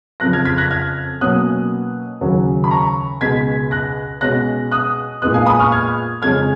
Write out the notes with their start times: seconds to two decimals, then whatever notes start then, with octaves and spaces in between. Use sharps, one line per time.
0.20 F2 C#3 F3 F#6 A#6
0.33 F6 G#6
0.45 G#6 B6
0.58 F#6 A#6
0.71 F6 G#6
1.21 B2 F#3 A#3 C#4 D#6 F#6
2.21 D#2 C#3 F#3 C#4
2.64 B5
2.71 A#5 C#6
3.21 C#2 B2 G#3 G#6 B6
3.71 F#6 A#6
4.21 B2 G#3 C#4 F#6 A#6
4.72 D#6 F#6
5.22 A#2 G#3 B3 D#6 F#6
5.34 F5 G#5
5.46 B5 D#6
5.60 C#6 F6
5.72 F6 G#6
6.22 F2 C#3 G#3 C#4 F6 G#6